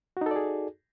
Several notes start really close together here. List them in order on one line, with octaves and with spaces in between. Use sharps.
F#4 D#4 A4 D5 G#4